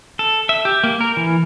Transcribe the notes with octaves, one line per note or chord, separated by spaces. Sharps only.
A4
E5
G4
A#3
A#4
E3